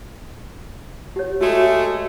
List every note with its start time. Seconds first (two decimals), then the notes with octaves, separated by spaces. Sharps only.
1.16 G4 C#5
1.41 G#3 A3 F#4